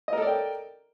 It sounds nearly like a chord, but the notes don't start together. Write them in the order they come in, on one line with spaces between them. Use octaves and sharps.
D#5 A#4 A4 D5 G5